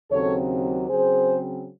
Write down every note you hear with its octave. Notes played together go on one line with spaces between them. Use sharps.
D#2 C#3 F#3 C4 A4 C#5
C#3 F#3 C4 G#4 C5